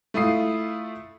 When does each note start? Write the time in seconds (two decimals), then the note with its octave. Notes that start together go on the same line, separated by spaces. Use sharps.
0.14 A3 E4 F4 D#6 C7